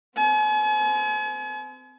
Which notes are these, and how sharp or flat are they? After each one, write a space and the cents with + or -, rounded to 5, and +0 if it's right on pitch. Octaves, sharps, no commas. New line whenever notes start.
C4 -35 G#5 +40